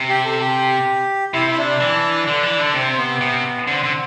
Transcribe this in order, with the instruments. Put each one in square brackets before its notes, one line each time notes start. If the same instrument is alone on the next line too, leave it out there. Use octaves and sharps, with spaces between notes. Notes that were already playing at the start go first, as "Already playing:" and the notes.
Already playing: [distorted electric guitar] C3
[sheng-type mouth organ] G4
A4
G4
[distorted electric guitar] C3 [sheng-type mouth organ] E4
[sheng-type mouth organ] E4
D4
[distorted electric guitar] E3
D3
E3
D3
[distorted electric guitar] C3 [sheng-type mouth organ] C4
[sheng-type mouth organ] C4
B3
[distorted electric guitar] C3
[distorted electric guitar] D3 [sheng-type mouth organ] C4
[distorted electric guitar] D3